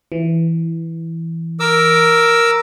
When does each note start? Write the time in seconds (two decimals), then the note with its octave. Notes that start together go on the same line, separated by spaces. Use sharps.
0.12 E3
1.60 A#4 D6 E6